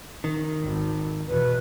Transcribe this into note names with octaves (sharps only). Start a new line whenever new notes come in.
D#3
G#1
E2 B2 B4